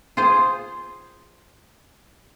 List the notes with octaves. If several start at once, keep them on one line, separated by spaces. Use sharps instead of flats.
F4 G#4 C5